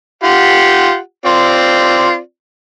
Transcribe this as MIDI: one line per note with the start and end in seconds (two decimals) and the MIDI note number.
0.24 0.98 65
0.24 0.98 67
0.24 0.98 78
1.26 2.18 60
1.26 2.18 65
1.26 2.18 74